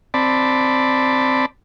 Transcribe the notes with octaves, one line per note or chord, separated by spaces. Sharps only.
C4 D5 A5 B5